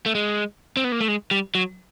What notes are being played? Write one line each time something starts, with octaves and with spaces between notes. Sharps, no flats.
A3
G#3
C4
B3
A#3
A3
G#3
G3
F#3